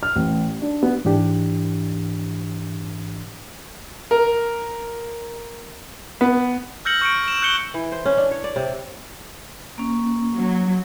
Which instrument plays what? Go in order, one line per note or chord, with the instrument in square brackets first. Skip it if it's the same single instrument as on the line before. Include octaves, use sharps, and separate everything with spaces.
[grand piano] F6
A1
D4
B3
[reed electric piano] G#2 E3 D4 G4
[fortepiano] A#4
B3
[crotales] E6 F6 G6 A#6 C#7 F#7
C#6 C#7 D7
E7
F#6 G6 C#7 G7
[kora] E3
C5
C#4
D4
C#5
D5
C3
[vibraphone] A#3 C#4
[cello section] F#3